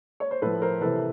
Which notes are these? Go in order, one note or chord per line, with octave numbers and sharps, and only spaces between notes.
C#5
C5
A2 F3 A4 B4
A#4 C5
C3 E3 A4 B4